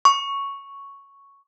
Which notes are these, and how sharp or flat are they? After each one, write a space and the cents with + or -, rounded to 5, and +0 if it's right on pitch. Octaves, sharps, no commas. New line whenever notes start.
C#6 +0